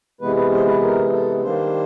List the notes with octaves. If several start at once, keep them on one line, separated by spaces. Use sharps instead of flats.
C3 E3 G#3 B3 B4
B4
C5
B4
A#4
A4
D#3 G3 A#3 D4 C5